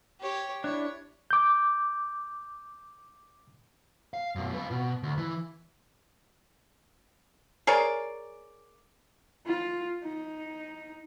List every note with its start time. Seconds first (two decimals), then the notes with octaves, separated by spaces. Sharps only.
0.20 G4 C#5
0.64 D4 E4 C#5
1.31 D6 G6
4.14 F5
4.35 F#2 B2
4.53 F4 B4
4.71 B2
5.03 D2
5.17 E3
7.67 G#4 A#4 C#5 D5
9.47 F4
10.03 D#4